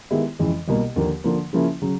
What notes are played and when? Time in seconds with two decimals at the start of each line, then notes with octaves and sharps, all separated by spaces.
0.10 D#3 G#3 B3 E4 G4
0.39 F2 C#3 E3 G#3
0.68 C2 B2 G3 A#3
0.96 D#2 D3 F3 A#3
1.24 D3 F3 A#3
1.53 C#3 F3 A#3 C#4 E4
1.82 C#3 F#3